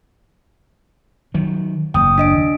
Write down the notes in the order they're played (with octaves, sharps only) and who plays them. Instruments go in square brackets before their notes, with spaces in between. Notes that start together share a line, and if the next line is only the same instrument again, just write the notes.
[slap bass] D#3 F#3
[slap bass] F#1 D#2 [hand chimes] G5 D#6
[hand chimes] D4 D#5 D7